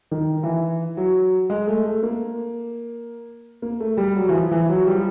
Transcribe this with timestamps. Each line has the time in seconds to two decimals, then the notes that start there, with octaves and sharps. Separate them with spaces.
0.11 D#3
0.43 E3
0.97 F#3
1.50 G#3
1.67 A3
1.85 A3
2.03 A#3
3.62 A#3
3.80 A3
3.97 G3
4.16 F#3
4.29 E3
4.33 F3
4.51 E3
4.69 F#3
4.87 G3
4.96 F3